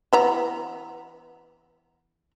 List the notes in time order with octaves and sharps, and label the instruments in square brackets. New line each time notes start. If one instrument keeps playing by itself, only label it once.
[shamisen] E3 B3 A#5